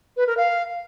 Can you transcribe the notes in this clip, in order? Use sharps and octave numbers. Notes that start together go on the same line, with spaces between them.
B4
A#4
F5